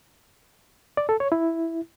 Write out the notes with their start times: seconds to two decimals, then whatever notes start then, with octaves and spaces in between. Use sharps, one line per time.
0.97 D5
1.09 A4
1.20 C#5
1.32 E4